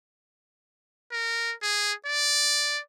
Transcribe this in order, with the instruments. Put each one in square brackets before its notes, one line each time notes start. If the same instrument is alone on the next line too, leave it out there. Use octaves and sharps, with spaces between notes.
[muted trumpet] A#4
G#4
D5